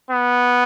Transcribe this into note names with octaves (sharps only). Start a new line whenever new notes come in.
B3